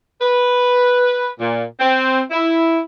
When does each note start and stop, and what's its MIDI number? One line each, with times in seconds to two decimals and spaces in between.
0.21 1.28 71
1.39 1.64 46
1.80 2.21 60
2.30 2.79 64